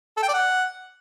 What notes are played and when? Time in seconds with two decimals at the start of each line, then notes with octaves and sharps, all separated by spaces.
0.17 A4
0.23 G5
0.28 D5
0.34 F#5